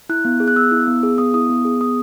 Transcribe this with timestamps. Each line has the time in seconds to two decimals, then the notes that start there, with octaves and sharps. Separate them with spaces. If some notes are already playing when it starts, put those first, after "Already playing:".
0.09 E4 F#6
0.25 B3
0.40 G#4
0.48 F#6
0.56 B3 E6
0.72 E4
0.87 B3
1.03 G#4
1.18 B3 D#6
1.34 E4 D#6
1.50 B3
1.65 G#4
1.81 B3 D#6